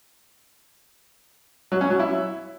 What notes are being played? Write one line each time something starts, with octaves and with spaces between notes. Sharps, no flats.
F#3
C#4
F#3
E4